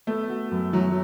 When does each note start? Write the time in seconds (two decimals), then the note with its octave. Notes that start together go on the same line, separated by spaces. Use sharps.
0.07 A3 B3
0.29 F#4
0.51 F#2
0.73 E3 F#3